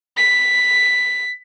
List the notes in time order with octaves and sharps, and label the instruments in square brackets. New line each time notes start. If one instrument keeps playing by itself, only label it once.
[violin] B6